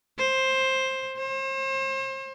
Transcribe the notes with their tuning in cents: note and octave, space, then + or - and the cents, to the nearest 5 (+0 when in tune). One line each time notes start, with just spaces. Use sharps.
C5 +10
C5 +40